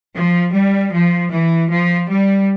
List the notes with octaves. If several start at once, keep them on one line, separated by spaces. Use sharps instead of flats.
F3
G3
F3
E3
F3
G3